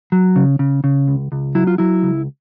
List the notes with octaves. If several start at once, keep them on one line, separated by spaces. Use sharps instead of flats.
F#3
C#3
C#3
C#3
C#2
C#2
F#3 E4
F4
F#3 E4
C#2